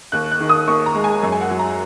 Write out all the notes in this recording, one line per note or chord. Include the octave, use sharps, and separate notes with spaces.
D#2 F#6
F#6
D#3
D#6
D#2 C#6
A#5
G#3
G#5
F#2
G#5
F#5
F#3
A#5